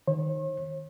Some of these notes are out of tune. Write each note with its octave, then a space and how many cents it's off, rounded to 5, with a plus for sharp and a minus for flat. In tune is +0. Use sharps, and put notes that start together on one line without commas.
D#3 +0 C#5 -45